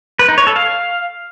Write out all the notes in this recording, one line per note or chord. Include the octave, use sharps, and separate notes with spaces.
B4
D#4
C#5
A4
F5